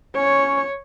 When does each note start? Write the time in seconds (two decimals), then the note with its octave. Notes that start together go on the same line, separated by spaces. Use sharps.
0.16 C#4 C#5